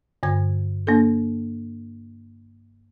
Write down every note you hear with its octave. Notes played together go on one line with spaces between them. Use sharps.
G2 D3 G#6
A#3 D4 A4